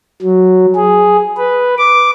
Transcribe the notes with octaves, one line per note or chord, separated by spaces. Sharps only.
F#3
G#4
B4
D6